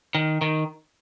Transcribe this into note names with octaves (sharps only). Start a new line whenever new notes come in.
D#3
D#3